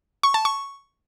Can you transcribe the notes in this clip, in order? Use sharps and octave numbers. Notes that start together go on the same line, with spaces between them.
C#6
A5
C#6